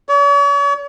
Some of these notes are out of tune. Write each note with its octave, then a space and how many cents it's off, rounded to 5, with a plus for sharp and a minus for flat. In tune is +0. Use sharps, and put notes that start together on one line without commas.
C#5 +45